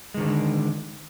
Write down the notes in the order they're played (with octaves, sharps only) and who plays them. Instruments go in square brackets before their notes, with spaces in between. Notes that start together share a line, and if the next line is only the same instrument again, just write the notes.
[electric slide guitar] G#3
D#3
D3